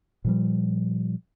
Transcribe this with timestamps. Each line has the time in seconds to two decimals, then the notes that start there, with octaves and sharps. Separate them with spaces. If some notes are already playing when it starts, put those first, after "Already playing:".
0.24 A#2 F3 G3